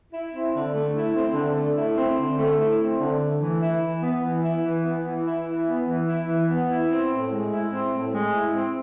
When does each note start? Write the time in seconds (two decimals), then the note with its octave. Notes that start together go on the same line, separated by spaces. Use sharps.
0.13 E4
0.33 C4
0.54 D3
0.74 A3
0.94 E4
1.15 C4
1.35 D3
1.56 A3
1.76 E4
1.96 C4
2.17 D3
2.38 A3
2.58 E4
2.79 C4
2.99 D3
3.20 A3
3.41 E3
3.61 E4
3.82 E3
4.02 B3
4.23 E3
4.43 E4
4.63 E3
4.83 B3
5.05 E3
5.25 E4
5.45 E3
5.66 B3
5.86 E3
6.07 E4
6.28 E3
6.48 B3
6.69 E4
6.90 C4
7.09 A2
7.31 G#3
7.50 E4
7.71 C4
7.92 A2
8.12 G#3
8.33 E4
8.53 C4